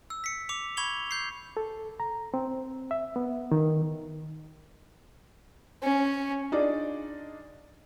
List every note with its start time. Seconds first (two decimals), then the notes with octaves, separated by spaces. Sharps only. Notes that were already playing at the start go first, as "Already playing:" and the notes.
0.10 E6
0.24 B6 C#7
0.49 D6 C#7 F7
0.77 B5 C#6 G#6 F7 G7
1.11 G6 C7
1.57 A4
2.00 A#5
2.34 C4
2.91 E5
3.16 B3
3.52 D#3
5.83 C#4
6.52 D4 D#4 F4 G#4 D5